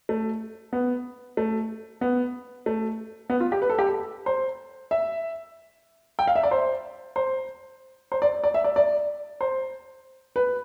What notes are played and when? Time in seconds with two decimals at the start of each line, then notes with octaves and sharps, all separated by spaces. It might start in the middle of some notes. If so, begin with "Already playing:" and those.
0.09 A3
0.73 B3
1.37 A3
2.01 B3
2.66 A3
3.30 B3
3.40 F4
3.52 G4
3.62 B4
3.70 A4
3.79 G4
3.87 A4
4.26 C5
4.91 E5
6.19 G5
6.28 F5
6.36 E5
6.43 D5
6.51 C5
7.16 C5
8.12 C5
8.22 D5
8.44 D5
8.54 E5
8.64 D5
8.76 D5
9.41 C5
10.36 B4